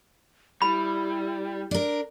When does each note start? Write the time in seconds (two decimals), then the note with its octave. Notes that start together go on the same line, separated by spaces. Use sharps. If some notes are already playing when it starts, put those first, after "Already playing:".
0.62 G3 E4 B5
1.71 D4 A#4